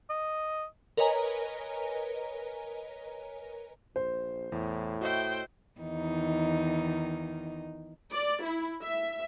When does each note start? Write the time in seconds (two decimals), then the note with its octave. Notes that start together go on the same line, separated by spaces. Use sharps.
0.10 D#5
0.97 A#4 B4 C#5 D#5 G#5 A#5
3.96 A#1 C5
4.52 E2 A2
5.01 F#4 C5 D#5 E5 G5
5.80 E2 D#3 D#4
8.11 D5
8.43 E4
8.81 E5